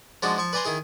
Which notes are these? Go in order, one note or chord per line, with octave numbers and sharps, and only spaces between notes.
F3 G#3 D4 D#4 F#4
F3 C#6
B4 D5 G#5 A#5 C6
D#3 D#4 E4 G#4